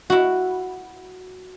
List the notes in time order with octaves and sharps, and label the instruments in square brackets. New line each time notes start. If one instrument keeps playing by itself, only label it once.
[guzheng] E4 F#4